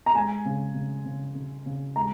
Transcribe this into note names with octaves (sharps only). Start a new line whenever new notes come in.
A#5
G#3 G#5
C#3
C#3
C#3
C#3
C#3
G#3 A#5